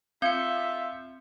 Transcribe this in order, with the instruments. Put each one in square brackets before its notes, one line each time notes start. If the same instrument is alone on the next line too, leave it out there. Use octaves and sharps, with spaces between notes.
[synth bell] C4 [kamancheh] F4 E5 [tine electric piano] G6 C#7